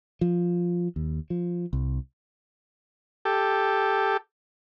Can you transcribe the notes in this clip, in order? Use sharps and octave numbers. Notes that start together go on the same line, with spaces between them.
F3
D#2
F3
C2
G4 A4